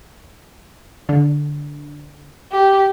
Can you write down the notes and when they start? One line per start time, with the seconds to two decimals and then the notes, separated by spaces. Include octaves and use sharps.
1.09 D3
2.52 G4